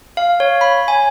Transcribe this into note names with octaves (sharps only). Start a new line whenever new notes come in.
F5
C#5
B5
G#5